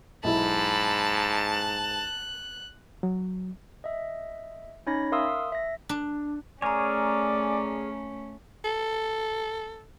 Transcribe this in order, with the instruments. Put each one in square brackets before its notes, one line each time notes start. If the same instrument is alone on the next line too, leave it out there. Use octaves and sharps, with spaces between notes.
[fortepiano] B1 E4 [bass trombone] G#2 [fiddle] A5 [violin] B5
[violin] F#6
[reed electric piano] F#3
[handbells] D#5 E5
C#4 D#4 C#5 B5 A#6
A#4 E5 F5 C6 D#6 E6
E5 A#6
[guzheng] D4
[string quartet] A3 C#4 [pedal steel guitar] G#4 A#4 C#5 [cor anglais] D5 [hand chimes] G#5 A#5
[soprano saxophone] A4